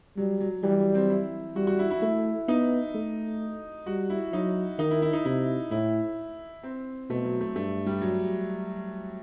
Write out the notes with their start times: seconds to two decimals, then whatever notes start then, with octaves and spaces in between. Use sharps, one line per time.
0.17 F#3 G3
0.40 F#3
0.63 E3 G3
0.78 F#3
0.95 C4
1.09 E4
1.56 G3 F#4
1.67 F#4
1.79 E4
1.91 E4
2.02 A3 E4
2.48 B3 D#4
2.95 A3
3.86 G3 F#4
4.10 E4
4.33 F#3 D#4
4.79 D#3 D#4
4.91 E4
5.02 E4
5.13 D#4
5.25 C3 E4
5.71 A2 E4
6.63 C4
7.10 B2 A3
7.25 F#3
7.41 A3
7.56 G2 A3
7.86 G3
8.01 F#3